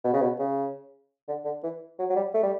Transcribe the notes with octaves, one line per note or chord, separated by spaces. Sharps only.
B2
C#3
B2
C#3
D3
D3
E3
F#3
F#3
G3
A3
G3